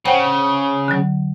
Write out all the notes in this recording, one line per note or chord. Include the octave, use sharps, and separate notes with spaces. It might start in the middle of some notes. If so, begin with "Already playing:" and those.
C#3 C5 F#5 G5
D3 F#3